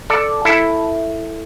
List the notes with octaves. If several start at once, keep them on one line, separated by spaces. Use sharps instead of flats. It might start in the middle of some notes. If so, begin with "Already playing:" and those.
A4 D5
E4 A4